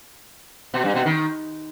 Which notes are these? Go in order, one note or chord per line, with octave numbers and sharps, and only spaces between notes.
B2
G2
B2
D#3